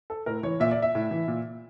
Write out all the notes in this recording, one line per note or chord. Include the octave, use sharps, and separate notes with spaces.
A4
A2 A#4
E3 C#5
A#2 E5
D5
E5
A2
E3
A#2